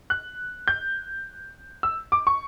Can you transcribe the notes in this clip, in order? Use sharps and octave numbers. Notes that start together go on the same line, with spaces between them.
F#6
G6
E6
D6
C#6